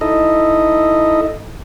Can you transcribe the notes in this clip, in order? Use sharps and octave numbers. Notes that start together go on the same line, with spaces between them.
D#4 E4 A4 D#5